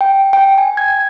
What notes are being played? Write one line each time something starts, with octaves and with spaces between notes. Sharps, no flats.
G5
G5
G#5
G#6